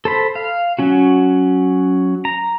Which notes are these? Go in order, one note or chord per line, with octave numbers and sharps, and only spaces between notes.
A4 C5 B5
F5
F#3 C#4 F#4
A#5